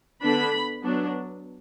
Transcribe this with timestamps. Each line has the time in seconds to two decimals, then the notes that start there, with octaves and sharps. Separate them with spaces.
0.22 D3 B3 D4 B5
0.84 F#3 B3 D4